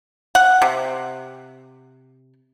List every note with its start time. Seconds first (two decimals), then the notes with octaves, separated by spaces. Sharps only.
0.35 F#5
0.62 C3